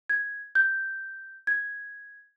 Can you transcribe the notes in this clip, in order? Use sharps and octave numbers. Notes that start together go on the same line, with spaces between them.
G#6
G6
G#6